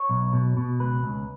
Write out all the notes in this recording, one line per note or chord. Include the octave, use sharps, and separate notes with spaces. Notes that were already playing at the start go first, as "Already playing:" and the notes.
Already playing: C#5
B1
B2
B2
C#2 B4
C#2